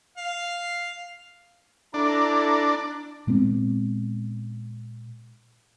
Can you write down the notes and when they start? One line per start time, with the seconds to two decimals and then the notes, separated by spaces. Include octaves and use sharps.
0.17 F5
1.94 D4 E4 A4 A#5
3.27 A#2 G#3 B3 C4